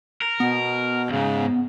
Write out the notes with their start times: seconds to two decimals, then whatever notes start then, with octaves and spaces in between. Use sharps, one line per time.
0.22 A#4
0.40 B2 B3
1.09 C2 G#2 C#3